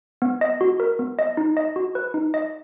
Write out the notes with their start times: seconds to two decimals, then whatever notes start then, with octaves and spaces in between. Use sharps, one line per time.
0.22 B3
0.41 D#5
0.61 F#4
0.80 A#4
0.99 B3
1.19 D#5
1.37 D#4
1.57 D#5
1.76 F#4
1.95 B4
2.14 D#4
2.34 D#5